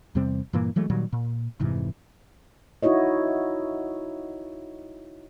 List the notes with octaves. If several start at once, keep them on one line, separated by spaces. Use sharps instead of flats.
E2 C3 G3 C4
G2 A#2 E3 A#3
E3 F#3 G#3 A3
A#2 D#3 F#3 G3
A#2
F1 G#2 C3 E3
D#4 E4 F#4 C#5 D#5